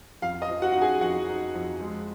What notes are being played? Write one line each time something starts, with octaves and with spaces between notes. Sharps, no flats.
F2 F5
D#5
F3
F#4 F#5
D#4 F#5
G#4 G#5
F2 F#4 F#5
D#4
F2
G#3